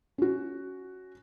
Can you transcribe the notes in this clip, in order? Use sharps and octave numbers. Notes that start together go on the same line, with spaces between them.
C#4 F#4